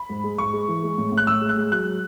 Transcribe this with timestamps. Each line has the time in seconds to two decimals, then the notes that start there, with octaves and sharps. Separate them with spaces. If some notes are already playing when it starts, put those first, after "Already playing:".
Already playing: B5
0.09 G#2
0.24 G#3
0.38 G#2 C#6
0.53 G#3
0.68 E3
0.83 G#3
0.98 A2
1.12 A2
1.17 F#6
1.27 A2 E6
1.41 G#3
1.49 F#6
1.57 G#3
1.72 F#3 F#6